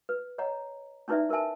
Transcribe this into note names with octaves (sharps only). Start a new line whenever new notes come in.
B4
C#5 D#5 F#5 A#5
C#4 D#4 E4 B4 D5 E5
E4 A#4 B4 E5 G#5 A5